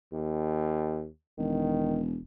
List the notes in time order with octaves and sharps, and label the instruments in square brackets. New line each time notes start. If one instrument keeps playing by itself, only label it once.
[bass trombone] D#2
[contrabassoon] E1 [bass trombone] D#3